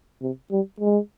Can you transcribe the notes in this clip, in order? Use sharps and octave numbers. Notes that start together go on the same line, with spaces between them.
C3
G3
G#3